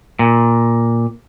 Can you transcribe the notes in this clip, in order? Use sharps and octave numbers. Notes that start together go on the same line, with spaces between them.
A#2